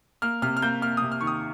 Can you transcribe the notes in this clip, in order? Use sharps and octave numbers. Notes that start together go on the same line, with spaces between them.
A#3 F6
C3 F6
F6
A#3 G6
A#3 F6
C3 D#6
F6
D#3 C#6
D#6